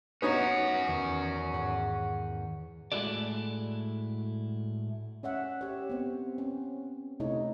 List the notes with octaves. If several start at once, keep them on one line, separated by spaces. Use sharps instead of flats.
B3 C#4 D#4 F#4 C#5
E2 D#3
G#2 F#5
A2 G#3 E4 F#4 A4 D5
C#4 C#5 E5 F#5
G4 C#5
B3 C4
C#4
C3 A3 D#4 E4 C#5